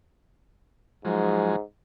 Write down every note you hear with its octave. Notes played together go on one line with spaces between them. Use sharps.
G#2 F3 F#3 G#3